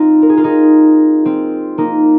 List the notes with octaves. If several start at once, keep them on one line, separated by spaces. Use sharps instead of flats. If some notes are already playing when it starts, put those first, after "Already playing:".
Already playing: C4 D#4 F4
A#4
G#4
F4
D#4 G#4
C4 F4
A#3 D#4